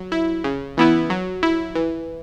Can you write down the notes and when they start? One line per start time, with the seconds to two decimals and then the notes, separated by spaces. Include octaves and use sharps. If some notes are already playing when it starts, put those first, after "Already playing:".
Already playing: F#3
0.12 E4
0.44 C#3
0.77 E3 B3 E4
1.10 F#3
1.43 E4
1.75 E3